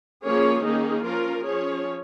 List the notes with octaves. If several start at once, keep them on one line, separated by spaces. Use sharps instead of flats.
F3 A#3 C#4 G#4 C#5
D#3 A#3 C#4 D#4 G#4
F3 C#4 F4 A#4
F3 C#4 G#4 C#5